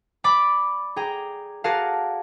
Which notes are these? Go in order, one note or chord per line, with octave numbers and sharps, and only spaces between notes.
D5 B5 D6
G#4 G5 A#5
F#4 G#4 A#4 D5 F5 A5